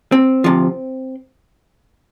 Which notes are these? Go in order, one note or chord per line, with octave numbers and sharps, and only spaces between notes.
C4
D2 C3 F3